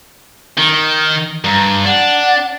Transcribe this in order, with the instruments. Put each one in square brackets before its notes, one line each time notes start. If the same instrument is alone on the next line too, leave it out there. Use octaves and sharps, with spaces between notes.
[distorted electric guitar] D#3
[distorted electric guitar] G2 [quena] A#5
[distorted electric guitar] D4 [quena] F#5